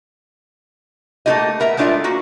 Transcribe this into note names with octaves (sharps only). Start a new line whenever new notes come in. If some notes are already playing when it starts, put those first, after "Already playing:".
A3 A#3 C4 F4 G4 D#5
B3 A#4 E5
G#3 A3 D4 F4 B4 E5
A#3 F#4